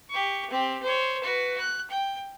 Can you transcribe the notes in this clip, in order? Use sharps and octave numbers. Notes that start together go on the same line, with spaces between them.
G4 C#6
C4 G4
C5 C#5
F#4 B4
F#6
G5